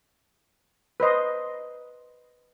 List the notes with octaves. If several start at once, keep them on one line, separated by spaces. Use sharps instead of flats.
B4 C5 D#5 C6